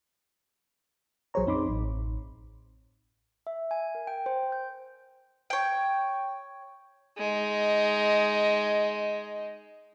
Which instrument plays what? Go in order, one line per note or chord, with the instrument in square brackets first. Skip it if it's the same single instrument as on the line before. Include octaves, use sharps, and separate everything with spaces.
[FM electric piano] B1 F#3 G#4 C5 C#5 A#5
F#2 C4 D#4 B5 C6 D6
A1
[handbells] E5
G#5
A#4
G5
C5
G6
[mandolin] C#5 G5
[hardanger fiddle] G#3 D#4